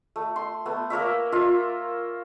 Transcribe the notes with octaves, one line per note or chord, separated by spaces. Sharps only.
A3
C6
A3 B3
A#3 A#4 C#5 E5
F4 A#4 E5